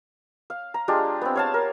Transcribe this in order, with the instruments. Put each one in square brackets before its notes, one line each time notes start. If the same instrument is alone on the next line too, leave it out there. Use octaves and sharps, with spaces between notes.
[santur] F5
A#5
G#3 D4 F4 G4
B3 C4
C#5 F5 A5
A#4